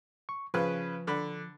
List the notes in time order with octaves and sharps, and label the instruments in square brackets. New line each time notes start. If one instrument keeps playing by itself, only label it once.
[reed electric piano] C#6
[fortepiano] C#3 B4 [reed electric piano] F3
[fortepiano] D3 B5